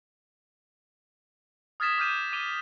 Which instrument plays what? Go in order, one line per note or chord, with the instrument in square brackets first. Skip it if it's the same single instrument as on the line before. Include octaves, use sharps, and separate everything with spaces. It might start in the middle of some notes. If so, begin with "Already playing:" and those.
[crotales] D#6 F6 G#6 A6 B6 E7
D6 F6 G6 D#7 E7
D6 D#7 F7 G7